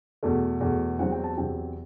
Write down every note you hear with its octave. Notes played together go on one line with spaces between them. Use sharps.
E2 B2 A3
E2 B2 A3
E2 C3 F#3 C4 F#5
G5
A5
E2 C3 F#3 C4 G5